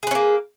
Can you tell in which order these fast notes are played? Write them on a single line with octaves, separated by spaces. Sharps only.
G#4 B4 C#4 A#3